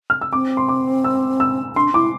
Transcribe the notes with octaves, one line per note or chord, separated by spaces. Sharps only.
F6
E6
C4 D6
C6
D6
E6
E6
D4 C6
E4 D6